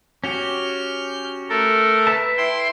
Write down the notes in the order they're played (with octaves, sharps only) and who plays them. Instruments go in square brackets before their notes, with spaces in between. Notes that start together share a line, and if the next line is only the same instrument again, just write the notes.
[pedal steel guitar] C#4 F#4 G4 [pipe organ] F6 G6
[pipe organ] A3 A4 A#4
[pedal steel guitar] B4 E5 A5
[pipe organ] E4 G5 C6